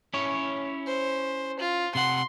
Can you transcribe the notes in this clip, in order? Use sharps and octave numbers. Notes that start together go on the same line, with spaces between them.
C#4 E4 C#5
C5
F4
C3 F#5 C6